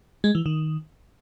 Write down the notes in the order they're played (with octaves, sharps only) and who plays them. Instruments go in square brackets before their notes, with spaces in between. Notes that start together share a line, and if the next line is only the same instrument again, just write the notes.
[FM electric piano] G#3
E3
D#3